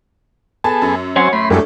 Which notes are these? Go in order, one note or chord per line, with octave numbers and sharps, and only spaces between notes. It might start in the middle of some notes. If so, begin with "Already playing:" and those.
B3 G#4 A4 A5
F#2
F#3 C4 C5 C#5 F#5 G#5
A2 B5 C6
F#2 G3 G#3 A#3 D4 A4